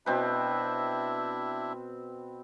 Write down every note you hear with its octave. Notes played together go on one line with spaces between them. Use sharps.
B2 C4 D4 E4 B4 E5